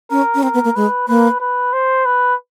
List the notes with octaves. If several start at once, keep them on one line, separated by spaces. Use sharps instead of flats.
C#4 A#4
C#4
C4 A#4
B3
A#3
G#3 B4
A#3 B4
B4
C5
B4